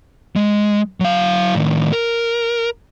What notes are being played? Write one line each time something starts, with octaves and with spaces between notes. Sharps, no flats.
G#3
F#3 F5
A2 D#3
A#4